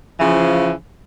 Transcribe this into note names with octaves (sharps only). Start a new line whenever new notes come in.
C#3 E3 F3